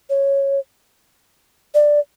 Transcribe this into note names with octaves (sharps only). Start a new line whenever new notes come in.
C#5
D5